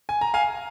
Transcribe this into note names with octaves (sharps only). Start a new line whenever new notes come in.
G#5
A#5
F5 G#5